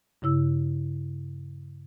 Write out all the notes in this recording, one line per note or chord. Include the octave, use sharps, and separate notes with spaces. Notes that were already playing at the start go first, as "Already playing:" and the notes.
G2 C#3 E4 E6